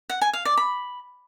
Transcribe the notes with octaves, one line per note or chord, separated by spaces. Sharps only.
F#5
G#5
F5
D5
B5